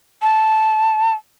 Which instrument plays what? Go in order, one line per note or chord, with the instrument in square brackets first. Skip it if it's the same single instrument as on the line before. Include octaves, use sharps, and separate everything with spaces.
[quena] A5